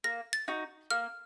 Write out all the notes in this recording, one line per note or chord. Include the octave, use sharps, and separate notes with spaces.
A#3 A#6
A6
D#4 F#4
A#3 F6